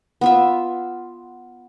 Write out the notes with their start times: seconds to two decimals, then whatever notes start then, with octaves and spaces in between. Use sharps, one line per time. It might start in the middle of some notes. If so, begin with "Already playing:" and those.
0.21 B3 F4 E5